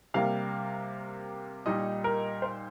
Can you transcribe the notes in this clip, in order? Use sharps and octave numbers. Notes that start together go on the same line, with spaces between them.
C3 G3 A#3 F5
A#2 G3 D#4 D#5
A#4
C5